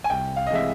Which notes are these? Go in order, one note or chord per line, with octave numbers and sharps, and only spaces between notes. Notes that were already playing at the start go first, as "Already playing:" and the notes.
G#5
C2 G5
F5
D#5
C3 E3 G#3 E5